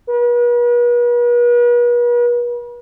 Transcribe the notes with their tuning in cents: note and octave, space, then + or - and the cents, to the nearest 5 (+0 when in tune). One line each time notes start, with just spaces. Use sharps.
B4 -45